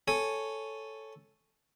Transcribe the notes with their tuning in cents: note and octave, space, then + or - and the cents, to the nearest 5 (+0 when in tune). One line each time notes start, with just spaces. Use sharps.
A4 +0 C#5 +0 G#5 +0